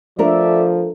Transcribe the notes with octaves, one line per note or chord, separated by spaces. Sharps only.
F3 A3 D4 A4 A#4 D5 E5